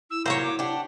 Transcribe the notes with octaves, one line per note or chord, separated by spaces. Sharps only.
E4 E6
A#2 F3 F#3 C5 C#5 A#5
D6
D4 G4 F#5